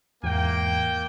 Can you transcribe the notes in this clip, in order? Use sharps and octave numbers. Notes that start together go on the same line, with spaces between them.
E2 G#2 A#3 G5